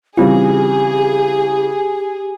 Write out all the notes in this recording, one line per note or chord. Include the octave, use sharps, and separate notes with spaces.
C#3 E3 G3 C4 F4 G4 G#4